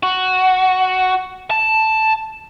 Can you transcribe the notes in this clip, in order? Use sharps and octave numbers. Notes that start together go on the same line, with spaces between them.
F#4
A5